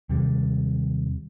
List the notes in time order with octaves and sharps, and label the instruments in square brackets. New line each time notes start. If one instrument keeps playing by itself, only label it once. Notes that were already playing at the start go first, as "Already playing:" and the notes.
[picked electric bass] D#2 C3 G3